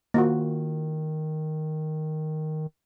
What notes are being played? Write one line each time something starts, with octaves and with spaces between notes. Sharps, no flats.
D#3 A#3 F4 F#4